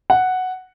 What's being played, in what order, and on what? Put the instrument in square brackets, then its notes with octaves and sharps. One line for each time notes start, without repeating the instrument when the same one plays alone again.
[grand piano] F#5